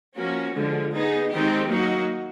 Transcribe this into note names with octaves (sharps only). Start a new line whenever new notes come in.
F3 A#3 C#4 F#4
D3 F3 G#3
B3 D#4 G#4
D#3 G#3 C4 D#4 G4
F#3 A#3 D#4 F#4